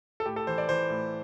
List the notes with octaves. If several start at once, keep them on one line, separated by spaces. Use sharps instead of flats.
A4
A2 G4
A4
E3 C5
D5
E3 C5
A2